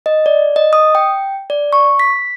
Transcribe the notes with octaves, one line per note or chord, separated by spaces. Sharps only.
D#5
D5
D#5
D#6
G5
D5
C#6
B6